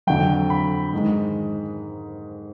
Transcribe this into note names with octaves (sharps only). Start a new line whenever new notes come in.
F2 D3 F#3 G5
B5
G#2 D#3 G#3